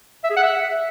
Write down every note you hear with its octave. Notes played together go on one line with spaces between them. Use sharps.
E5
G#4
F#5
E5